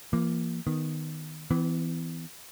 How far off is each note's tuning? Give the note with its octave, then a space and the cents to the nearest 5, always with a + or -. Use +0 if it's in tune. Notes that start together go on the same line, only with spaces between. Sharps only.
E3 +45 A#3 +0
D#3 +0 B3 +0
E3 +0 B3 +45